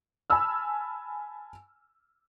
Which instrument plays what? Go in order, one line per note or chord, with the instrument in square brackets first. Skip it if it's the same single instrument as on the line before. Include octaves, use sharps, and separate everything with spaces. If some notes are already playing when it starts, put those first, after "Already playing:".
[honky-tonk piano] G#5 A5 B5 E6 F6